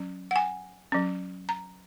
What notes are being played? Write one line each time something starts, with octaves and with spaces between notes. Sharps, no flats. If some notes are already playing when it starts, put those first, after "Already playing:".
Already playing: F#3 C#4
F#5
G#5
F#3 C#4
A#5